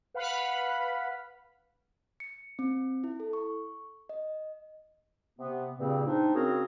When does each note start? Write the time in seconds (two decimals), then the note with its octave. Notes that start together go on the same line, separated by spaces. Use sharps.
0.14 B4 F5 F#5 B5
2.20 C#7
2.59 C4
3.04 E4
3.20 A4
3.33 C#6
4.09 D#5
5.39 C3 B3
5.79 G2 A#2 C#3 A#3 C4
6.06 C4 D4 D#4
6.35 C#3 C4 F#4 G#4 A#4